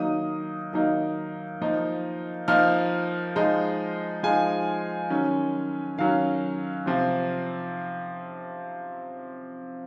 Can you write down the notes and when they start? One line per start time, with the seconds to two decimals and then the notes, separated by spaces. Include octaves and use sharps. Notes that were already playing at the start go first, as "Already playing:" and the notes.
Already playing: D#3 F#3 A#3 D#4 D#6
0.73 D#3 F#3 A#3 D#4
1.61 F3 A#3 D#4
2.48 F3 A#3 D#4 F6
3.36 F3 G#3 D#4
4.23 F3 G#3 D#4 G#5
5.10 D#3 F#3 C#4
5.98 D#3 F#3 C#4 F5
6.86 C3 F3 C4